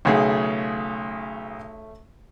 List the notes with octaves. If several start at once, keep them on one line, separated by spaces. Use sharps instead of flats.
B1 C#3 A3 C#4 G#4